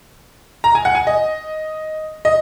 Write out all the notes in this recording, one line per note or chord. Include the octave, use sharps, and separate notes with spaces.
A#5
G#5
F#5
G#5
D#5
D#5